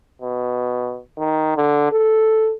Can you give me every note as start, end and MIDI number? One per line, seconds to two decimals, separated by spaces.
0.22 0.99 47
1.18 1.56 51
1.56 1.90 50
1.92 2.53 69